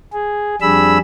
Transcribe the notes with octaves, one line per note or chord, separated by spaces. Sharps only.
G#4
F2 G3 D4 G#4 B5 E6